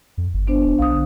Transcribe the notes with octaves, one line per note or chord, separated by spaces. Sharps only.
F2
G1
B3 D4 C5
E1
B1 F5 D#6
D3